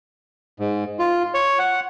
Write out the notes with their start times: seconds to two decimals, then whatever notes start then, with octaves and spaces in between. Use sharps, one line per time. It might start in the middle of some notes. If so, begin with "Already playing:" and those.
0.59 G#2
0.99 F4
1.34 C#5
1.59 F#5